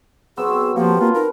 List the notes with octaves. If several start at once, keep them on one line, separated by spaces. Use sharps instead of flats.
F#3 B3 C4 G#4 E6
F3 A#3 C4 G4 A4
A#3 F4 B4
D#4 A#4